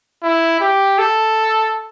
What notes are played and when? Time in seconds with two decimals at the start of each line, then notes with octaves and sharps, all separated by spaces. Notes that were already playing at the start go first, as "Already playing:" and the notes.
0.23 E4
0.61 G4
0.98 A4